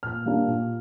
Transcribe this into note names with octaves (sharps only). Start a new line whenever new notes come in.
A#2 F6
G3 A#3 D4
A#2